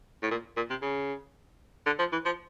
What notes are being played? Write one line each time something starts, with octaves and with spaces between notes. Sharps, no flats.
A2
A#2
A#2
C3
C#3
D3
F3
E3
F3